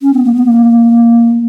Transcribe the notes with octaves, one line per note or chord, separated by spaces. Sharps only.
C#4
B3
A#3
B3
A#3